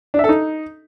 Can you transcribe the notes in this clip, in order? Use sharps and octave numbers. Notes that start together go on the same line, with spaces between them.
D4
E5
A4
D#4